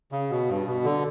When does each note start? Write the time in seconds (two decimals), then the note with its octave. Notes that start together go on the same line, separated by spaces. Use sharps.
0.12 C#3
0.30 B2
0.49 G2
0.66 B2
0.85 D3